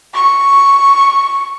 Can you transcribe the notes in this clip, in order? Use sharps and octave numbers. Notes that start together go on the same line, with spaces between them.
C#6